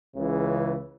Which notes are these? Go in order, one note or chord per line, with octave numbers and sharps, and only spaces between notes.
C#2 C#3 E3